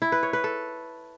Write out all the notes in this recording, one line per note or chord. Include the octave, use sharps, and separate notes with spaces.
E4
B4
C#5
B4
A4